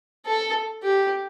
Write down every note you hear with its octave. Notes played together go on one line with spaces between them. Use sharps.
A4
G4